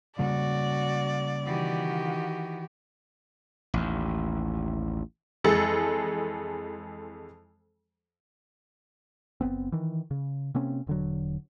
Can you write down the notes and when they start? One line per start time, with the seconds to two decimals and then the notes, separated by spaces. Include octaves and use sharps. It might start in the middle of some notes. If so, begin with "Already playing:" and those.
0.19 C#3 G3 A#3 F#4 D5
1.45 D#3 E3 F#4 G4
3.74 A1 D#2
5.44 F2 E3 G#3 G#4 A4 A6
9.41 F#1 B3 C4
9.72 D#3 E3
10.11 C#3
10.55 C3 A#3 C4 C#4
10.87 E1 D3 F#3